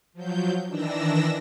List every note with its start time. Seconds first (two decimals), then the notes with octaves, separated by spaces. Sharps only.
0.13 F3 F#3 G6
0.66 D#3 E3 D4 E6 A#6